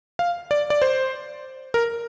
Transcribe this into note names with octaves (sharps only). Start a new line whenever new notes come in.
F5
D5
D5
C5
A#4